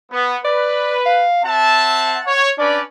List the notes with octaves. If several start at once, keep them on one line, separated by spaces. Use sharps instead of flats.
B3
B4 D5
F5
C4 E5 F#5 A5
C#5
C#4 D4 B4 D5